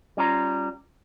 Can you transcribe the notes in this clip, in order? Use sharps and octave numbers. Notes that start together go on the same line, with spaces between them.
G3 C#4 F4 A#5